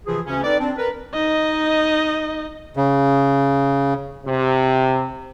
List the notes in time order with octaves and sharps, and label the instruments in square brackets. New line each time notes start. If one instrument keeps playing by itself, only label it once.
[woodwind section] C3 E3 F3 F4 G#4
D2 C#3 C#4
C4 D#4 A4 B4 D5
C4 D4
A#4 B4
[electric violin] D#4 D#5
[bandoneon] C#3
[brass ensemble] C3